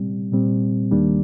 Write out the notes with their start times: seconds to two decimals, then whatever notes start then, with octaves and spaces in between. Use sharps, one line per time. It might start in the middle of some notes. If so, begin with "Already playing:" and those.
Already playing: A#2 G3 C4
0.32 A#2 G3 C4
0.91 D#2 D#3 G3 A#3 D4